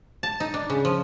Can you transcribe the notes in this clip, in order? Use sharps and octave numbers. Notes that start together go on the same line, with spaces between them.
A5
D#4
D4
C#3
F3